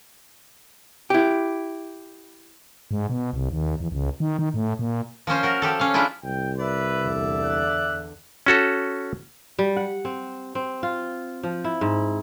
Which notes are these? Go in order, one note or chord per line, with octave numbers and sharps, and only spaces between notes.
E4 G4
G#2
B2
C2
D#2
E2
C#2
D#3
D#3
A2
A#2
F3 A#3 C#4 C5
F#4 A#4
F3 G4 A4
C#4 F5
F3 G#3 D4 E4 F4
C2 G5
B4 D5 E5
E2 D3
F#6
C#4 F#4 A4
G3
F#5
C4
C4
F4
F3
E4
G#2